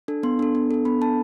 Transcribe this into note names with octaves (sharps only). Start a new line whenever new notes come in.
D4 A4
B3 C6
D4 A4
B3
D4 A4
B3 B5
D4 A4 A5